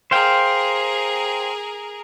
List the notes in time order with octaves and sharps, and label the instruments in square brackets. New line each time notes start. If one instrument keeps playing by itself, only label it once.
[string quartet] G#4 A#4 [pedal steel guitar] C5 F5 G5